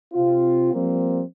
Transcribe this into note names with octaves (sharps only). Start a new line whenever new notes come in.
C3 C4 F4
F3 G3 A#3 C4